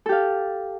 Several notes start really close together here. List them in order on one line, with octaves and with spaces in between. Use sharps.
A4 G4 F5